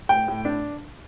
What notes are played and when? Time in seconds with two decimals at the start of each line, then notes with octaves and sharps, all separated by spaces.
0.09 A2 G5
0.28 A2
0.45 D4